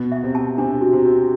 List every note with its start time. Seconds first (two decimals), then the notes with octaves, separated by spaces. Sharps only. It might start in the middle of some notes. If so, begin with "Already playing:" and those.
Already playing: B2 B3
0.12 E5
0.23 C3 C4
0.35 A5
0.58 C3 C4 D4
0.81 F#4
0.93 C3 C4
1.05 F#4